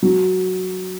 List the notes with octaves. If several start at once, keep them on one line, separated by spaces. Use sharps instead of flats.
F#3